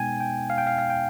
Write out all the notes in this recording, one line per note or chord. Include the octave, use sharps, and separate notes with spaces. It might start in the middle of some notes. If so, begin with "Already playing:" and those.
Already playing: B2 G#3 B3 D#4 G5 G#5
G5
F5
G5
F5
F5
G5